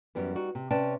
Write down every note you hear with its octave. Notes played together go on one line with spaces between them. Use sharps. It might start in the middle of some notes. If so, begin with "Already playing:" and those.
F#2 E3 G3 B3
G3 D#4 F#4
C3
C3 C#4 B4 D5 G5 A5